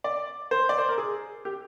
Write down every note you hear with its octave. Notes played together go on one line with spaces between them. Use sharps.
D5
C5
D5
C5
A#4
G#4
G4